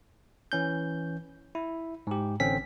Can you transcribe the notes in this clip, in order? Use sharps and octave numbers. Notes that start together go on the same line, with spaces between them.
E3 C#4 G6
E4
G#2 G4
A1 D3 C4 C#4 B6